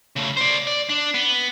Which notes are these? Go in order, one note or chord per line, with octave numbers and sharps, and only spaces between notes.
C#3 A3
C5 D5
D5
D4
B3